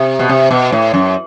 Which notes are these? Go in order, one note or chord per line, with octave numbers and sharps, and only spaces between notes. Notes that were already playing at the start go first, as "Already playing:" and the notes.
Already playing: C3
B2
C3
B2
A2
F#2